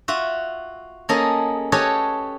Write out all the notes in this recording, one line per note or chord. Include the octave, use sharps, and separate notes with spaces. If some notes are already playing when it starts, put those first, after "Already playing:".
F4 F#4 E5
A#3 C#4 G#4 A4 D#5
G4 A4 B4 C#5 D#5 G#5